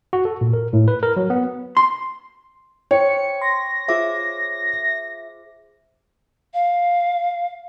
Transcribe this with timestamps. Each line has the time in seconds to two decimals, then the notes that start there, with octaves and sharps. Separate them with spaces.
0.13 F#4
0.25 A4
0.41 A#2
0.53 A#4
0.73 A2
0.88 B4
1.03 A#4
1.17 F#3
1.30 B3
1.77 C6
2.91 C5 C#5 G5 C#7
3.41 C6 A#6
3.88 F4 G#4 C5 E5 D6
6.54 F5